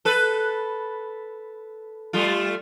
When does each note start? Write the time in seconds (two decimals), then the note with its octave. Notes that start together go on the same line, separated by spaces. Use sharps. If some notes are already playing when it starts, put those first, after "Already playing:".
0.05 A4 B4
2.13 G3 A3 F4